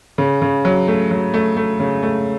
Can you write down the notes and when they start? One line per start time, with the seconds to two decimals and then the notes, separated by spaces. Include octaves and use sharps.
0.18 C#3
0.42 C#3
0.65 F#3
0.88 A3
1.11 F#3
1.34 A3
1.57 A3
1.80 C#3
2.03 A3